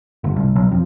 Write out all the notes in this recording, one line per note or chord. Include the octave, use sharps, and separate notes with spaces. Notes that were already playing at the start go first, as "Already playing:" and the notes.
G1
C2
B1
F2